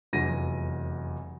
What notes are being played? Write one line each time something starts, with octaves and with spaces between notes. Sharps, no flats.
F1 E2 F#3 A#6 D#7